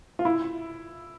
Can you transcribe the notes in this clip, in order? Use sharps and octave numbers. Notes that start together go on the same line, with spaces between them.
F4
E4